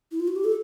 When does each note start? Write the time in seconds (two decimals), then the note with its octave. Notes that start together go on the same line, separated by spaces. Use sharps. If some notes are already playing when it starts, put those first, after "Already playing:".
0.12 E4
0.20 F4
0.28 F#4
0.36 G4
0.44 A4